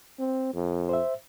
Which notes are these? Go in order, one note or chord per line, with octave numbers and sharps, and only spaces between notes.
C4
F2
C5 E5